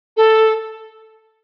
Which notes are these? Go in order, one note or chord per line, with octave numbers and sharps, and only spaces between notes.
A4